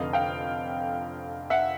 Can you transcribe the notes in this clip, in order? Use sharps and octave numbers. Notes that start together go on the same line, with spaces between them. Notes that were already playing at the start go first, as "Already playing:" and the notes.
Already playing: F1 F2 D3 D#5 F5
F5 G5
E5 F#5